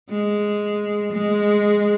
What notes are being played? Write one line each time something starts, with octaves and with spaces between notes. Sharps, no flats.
G#3
G#3